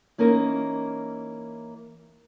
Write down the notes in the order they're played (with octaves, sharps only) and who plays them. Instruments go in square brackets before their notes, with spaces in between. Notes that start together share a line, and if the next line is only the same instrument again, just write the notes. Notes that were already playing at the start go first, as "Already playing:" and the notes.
[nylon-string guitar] E3 A#3 C#4 D#4 A#4